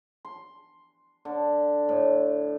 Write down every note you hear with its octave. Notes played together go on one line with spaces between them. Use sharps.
C6
D3
A2